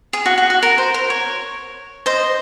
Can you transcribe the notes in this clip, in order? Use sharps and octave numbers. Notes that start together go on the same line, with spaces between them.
G#4
F#4
F#4
F#4
A#4
C5
A#4
C#5
C5 D#5